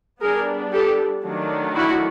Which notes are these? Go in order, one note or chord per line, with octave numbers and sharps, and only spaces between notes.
G3 B3 D4 G#4 A#4
G4 A4
D#3 F#3 A3 D4
E4 F#4